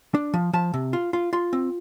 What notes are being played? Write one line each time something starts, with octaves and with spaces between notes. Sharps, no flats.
D4
F3
F3 A5
C3
F4
F4
F4 C6
C4